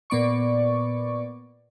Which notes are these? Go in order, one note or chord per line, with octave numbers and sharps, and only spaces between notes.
A#2 B3 D5 C#6